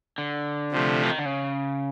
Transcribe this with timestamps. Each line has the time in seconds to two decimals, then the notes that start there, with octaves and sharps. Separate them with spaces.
0.18 D3
0.71 C3 F3 A3
1.03 E3
1.11 D#3
1.19 D3
1.26 C#3